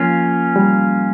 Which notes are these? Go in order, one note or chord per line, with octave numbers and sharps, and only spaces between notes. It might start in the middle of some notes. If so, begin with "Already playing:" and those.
Already playing: F3 A#3 C#4 F4
G3